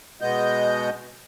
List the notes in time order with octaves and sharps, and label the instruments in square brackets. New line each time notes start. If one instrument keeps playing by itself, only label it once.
[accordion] B2 G#3 B3 D#5 G6